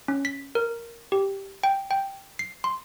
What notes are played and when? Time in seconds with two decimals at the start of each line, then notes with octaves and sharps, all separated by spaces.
0.08 C#4
0.25 B6
0.55 A#4
1.12 G4
1.63 G5
1.91 G5
2.39 C7
2.64 C6